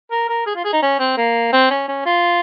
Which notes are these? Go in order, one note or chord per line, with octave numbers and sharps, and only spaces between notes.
A#4
A#4
G#4
F4
G#4
D#4
C#4
C4
A#3
C4
C#4
C#4
F4